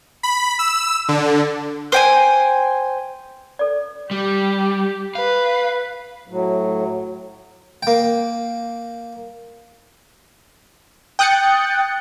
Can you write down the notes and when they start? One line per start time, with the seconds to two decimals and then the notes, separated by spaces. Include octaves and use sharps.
0.23 B5
0.59 E6
1.09 D3
1.92 C5 G5 G#5
3.59 A4 D5
4.11 G3 G4
5.15 B4 F5
6.27 A2 F#3
7.83 A#3 G5
11.19 G5 D#6 F#6 G6 A6 C#7